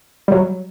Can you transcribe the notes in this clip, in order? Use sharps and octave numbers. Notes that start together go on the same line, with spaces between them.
G3
F#3